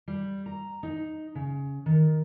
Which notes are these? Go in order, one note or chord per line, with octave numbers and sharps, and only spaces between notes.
G3
A#5
D#4
C#3
D#3